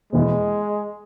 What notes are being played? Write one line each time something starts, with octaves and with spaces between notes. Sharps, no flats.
E1 E2 E3 G#3 B3